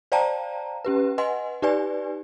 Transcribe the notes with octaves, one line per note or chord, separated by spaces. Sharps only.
C5 D5 F5 G5 A5 A#5
C#4 G4 B4
B4 D#5 F#5 G#5 C6
D#4 G4 B4 D5 G#5